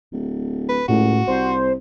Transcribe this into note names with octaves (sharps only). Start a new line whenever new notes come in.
D1
B4
C#2 A2 F#4
C2 C5